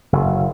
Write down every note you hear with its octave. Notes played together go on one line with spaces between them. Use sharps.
F#1